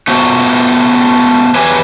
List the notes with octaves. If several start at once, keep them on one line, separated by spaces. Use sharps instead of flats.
A3 B3 F4 F#4 C5
E2 G4 B4 C#5 G#5